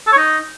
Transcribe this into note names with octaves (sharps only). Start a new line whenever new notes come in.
A4
C#5
D#4